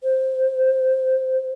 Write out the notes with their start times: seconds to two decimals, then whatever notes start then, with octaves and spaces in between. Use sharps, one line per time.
0.03 C5